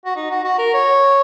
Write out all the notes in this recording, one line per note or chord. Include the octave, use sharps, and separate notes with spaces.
F#4
D#4
F#4
F#4
A#4
C#5